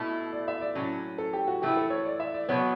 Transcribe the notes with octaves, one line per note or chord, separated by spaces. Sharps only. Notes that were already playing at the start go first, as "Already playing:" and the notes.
Already playing: B2 A3 E4
D5
E5
D5
A2 F#3 C#4
A4
G4
F#4
E3 A3 E4 G4
A4
C#5
D5
E5
D5
B2 F#3 B3 C#5